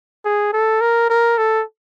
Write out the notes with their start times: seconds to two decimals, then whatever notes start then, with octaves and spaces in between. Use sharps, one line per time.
0.25 G#4
0.53 A4
0.81 A#4
1.10 A#4
1.38 A4